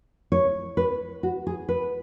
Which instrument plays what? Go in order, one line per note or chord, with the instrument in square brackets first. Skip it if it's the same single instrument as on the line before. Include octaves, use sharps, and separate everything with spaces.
[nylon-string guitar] C#5
B4
F#4
G#4
B4